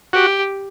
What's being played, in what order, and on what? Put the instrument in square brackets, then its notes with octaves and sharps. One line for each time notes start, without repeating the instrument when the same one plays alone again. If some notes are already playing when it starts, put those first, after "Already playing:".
[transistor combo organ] F#4 [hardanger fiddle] G4